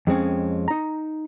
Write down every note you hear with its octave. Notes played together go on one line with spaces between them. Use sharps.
F2 G#3 C4 C#4
D#4 A#5